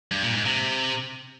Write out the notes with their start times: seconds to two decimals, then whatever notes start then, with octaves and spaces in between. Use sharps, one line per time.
0.11 G2
0.23 A#2
0.34 G#2
0.46 C3